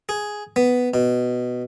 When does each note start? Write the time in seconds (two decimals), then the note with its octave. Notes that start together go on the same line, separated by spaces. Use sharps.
0.09 G#4
0.56 B3
0.94 B2